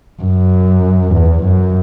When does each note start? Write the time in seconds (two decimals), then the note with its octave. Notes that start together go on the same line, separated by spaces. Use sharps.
0.22 F#2
1.14 E2
1.44 F#2